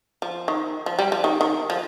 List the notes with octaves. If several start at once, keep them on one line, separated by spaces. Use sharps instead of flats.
F3
D#3
F3
G3
F3
D#3
D#3
F3